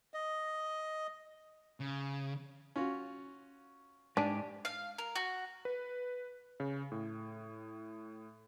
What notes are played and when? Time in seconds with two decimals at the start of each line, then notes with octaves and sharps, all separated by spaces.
0.14 D#5
1.80 C#3
2.76 C#4 F4 F#4
4.17 G#2 D4 G4 G#5
4.65 F5
4.98 A#4
5.16 F#4
5.65 B4
6.60 C#3
6.92 A2